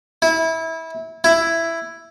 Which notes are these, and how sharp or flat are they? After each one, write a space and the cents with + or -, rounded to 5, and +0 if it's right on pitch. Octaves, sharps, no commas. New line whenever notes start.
E4 -20
E4 +10